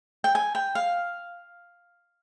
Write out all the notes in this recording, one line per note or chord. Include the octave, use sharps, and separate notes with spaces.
G5
G#5
G5
F5